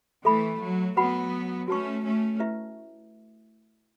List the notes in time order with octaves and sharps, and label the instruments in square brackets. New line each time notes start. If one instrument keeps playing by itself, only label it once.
[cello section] E3 A3 [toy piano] A4 E5 B5
[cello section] F#3
[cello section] F#3 B3 [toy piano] F#4 B4 F#5 B5
[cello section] A3 C#4 [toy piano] F#4 B4 A5 C#6
[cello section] A3 C#4
[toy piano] E4 B4 E5